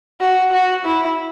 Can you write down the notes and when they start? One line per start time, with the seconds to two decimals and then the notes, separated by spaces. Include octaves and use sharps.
0.21 F#4
0.52 F#4
0.85 E4